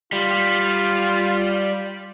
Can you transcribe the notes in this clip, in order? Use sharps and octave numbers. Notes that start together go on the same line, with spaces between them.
G3 F4